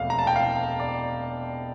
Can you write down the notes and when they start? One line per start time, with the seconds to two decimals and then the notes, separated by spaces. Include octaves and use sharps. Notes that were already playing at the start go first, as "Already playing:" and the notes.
Already playing: E1 E2 C3 F3 A3 F5
0.10 A#5
0.19 A5
0.27 G5
0.36 F5
0.80 D5